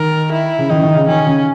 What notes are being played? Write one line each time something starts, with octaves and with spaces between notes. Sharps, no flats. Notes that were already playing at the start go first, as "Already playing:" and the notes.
Already playing: D#3 A#4
E4
C#3
D#3 D#4
C#3
D#3
C#3
D#3 C#4
C#3